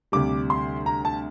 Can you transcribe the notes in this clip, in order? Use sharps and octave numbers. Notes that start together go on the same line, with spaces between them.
D2 C3 G3 D6
C6
A#5
A5